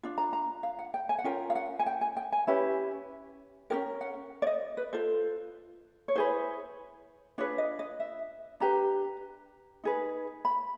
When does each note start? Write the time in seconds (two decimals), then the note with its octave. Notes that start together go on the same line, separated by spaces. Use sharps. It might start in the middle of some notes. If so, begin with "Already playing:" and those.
0.03 D4 F4
0.18 A#5
0.33 A#5
0.63 F5
0.79 F#5
0.94 G5
1.09 G#5
1.19 F#5
1.24 C#4 F4 A#4 G5
1.50 F5
1.55 F#5
1.79 G#5
1.86 G5
2.01 G#5
2.17 G5
2.32 G#5
2.47 C#4 E4 G4 B4
3.70 C#4 F#4 A#4 G5
4.01 F#5
4.42 D5
4.47 D#5
4.77 B4
4.93 F4 A4 C5
6.08 C#5
6.16 E4 G#4 B4 C5
7.38 D4 F4 G#4 B4 C#5
7.58 D#5
7.79 D#5
8.00 E5
8.60 D4 G4 B4 A#5
9.84 D#4 G#4 B4
10.45 B5